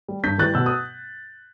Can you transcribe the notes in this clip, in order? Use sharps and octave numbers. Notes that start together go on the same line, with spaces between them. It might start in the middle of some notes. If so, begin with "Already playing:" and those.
G3
G2 G6 B6
E3 G3 F#6 A6
B2 E6 G6
D#6